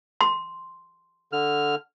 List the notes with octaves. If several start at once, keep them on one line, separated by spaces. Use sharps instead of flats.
C6
D3 F6